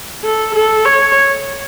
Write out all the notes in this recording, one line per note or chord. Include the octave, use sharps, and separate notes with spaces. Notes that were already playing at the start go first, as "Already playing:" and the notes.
A4
A4
C#5